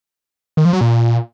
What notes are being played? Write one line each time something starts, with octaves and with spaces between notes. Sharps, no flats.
D#3
F3
F#3
A#2